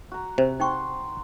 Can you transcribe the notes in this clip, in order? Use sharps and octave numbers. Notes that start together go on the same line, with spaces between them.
F#4 A#5
C3 C5
D#4 F#5 G5 C6 C#6